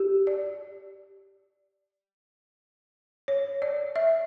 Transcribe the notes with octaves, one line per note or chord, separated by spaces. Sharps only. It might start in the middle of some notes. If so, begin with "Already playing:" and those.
Already playing: G4
D5
C#5
D5
E5